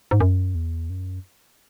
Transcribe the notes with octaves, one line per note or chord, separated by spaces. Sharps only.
G#2
F#2
E2
F#2